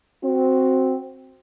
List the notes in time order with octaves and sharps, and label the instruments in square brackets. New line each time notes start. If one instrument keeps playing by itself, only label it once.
[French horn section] C4 F#4